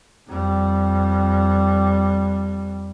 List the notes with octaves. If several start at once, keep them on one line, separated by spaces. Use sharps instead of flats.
F2 G3